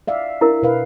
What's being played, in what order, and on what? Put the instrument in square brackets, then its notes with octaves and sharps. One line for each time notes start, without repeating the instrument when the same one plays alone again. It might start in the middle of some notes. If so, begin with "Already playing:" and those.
[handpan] D5 E5 F5
[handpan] D4 [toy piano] E4 A#4
[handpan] B2 B4 F5